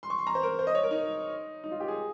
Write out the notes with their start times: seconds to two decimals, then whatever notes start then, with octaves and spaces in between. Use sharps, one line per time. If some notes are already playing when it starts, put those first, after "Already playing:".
0.03 C6
0.10 C#6
0.19 C6
0.27 A#5
0.35 C5
0.43 A#4
0.59 C5
0.67 D#5
0.75 C#5
0.83 A#4
0.91 D#4
1.64 D#4
1.71 F4
1.80 G4
1.88 G#4